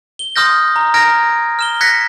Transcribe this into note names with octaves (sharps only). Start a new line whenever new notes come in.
G7
C6 D#6 F6 G6 A#6
A#5
A#5 F6 G#6 A#6 D7
F6 E7 G7
F#6 G#6 A#6 B6 C#7